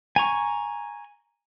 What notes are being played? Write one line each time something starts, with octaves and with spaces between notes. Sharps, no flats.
G#5 A#5 C#6